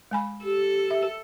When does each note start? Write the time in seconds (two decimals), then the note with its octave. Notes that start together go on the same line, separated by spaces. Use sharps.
0.11 G#3 G#5 B5
0.44 G4 A4
0.91 E5